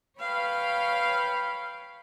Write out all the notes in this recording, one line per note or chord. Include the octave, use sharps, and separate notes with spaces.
B4 C#5 F5 G5 B5